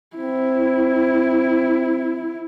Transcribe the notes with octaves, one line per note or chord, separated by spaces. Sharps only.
C4 E4